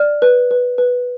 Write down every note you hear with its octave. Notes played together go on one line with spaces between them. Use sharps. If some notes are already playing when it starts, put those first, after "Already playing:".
Already playing: D5 F6
B4
B4
B4